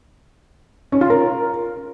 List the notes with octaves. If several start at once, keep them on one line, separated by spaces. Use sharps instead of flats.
C#4
F4
A#4